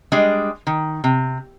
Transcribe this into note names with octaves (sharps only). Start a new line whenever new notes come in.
G3 G#3 D4 D#5
D#3
C3